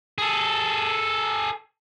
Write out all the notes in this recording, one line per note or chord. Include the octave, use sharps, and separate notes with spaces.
G#4 A4